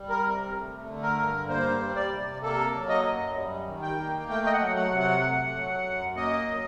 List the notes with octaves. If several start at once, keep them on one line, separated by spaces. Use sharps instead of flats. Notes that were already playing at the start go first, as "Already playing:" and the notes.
Already playing: G3
A#4
C3
A3
D3
A#4
G2
A#3 C5
G3
D5
C3
A#3 A4
F#3
D#5
F#2
G3
D#3
G5
A#3
A3 G5
D#5
F#5
F#3
F#5
C3
F#5
A3
F#3
F#2
A#3 D#5
F#3